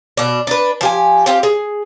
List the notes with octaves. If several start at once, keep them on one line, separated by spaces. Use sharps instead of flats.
B2 D4
D4 B4
F3 G4 G#5
C4 F4 G4
G#4